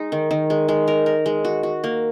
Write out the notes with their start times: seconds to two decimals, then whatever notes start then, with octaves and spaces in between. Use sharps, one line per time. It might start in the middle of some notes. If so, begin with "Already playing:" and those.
Already playing: G#3 D#4
0.12 D#3
0.31 D#3
0.50 G#3
0.68 G#3
0.88 A#4
1.06 A#4
1.26 G#3
1.45 F#4
1.63 F#4
1.84 A#3